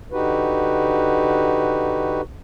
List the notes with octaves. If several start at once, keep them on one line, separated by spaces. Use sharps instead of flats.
D3 D#4 F#4 G4 B4